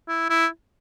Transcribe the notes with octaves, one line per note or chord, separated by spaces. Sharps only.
E4
E4